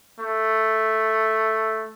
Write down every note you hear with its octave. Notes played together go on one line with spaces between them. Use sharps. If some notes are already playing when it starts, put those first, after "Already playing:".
A3